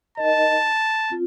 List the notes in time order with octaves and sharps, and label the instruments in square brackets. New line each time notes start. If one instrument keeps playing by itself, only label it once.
[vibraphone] D#4 A#4 D#5 [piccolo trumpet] A5
[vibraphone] C4 F4